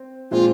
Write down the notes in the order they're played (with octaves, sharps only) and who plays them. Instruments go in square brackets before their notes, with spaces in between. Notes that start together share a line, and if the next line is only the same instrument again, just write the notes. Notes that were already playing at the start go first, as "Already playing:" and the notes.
Already playing: [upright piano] C4
[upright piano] A#2 F3 G#3 C4 [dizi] F4